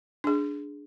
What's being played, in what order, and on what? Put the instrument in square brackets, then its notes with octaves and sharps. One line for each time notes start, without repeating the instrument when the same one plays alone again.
[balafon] D4 G#4